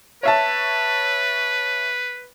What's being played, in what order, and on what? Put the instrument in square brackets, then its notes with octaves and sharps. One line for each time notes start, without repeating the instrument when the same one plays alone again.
[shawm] B4 [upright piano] C#5 E5 A5